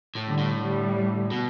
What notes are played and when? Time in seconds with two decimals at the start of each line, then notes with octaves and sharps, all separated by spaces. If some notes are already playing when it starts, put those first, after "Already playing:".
0.15 A2
0.26 D3 G3
0.38 A2
0.61 D3 G3
1.31 B2